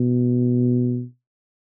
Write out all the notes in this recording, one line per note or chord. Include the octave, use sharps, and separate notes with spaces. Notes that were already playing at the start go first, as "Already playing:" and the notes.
Already playing: B2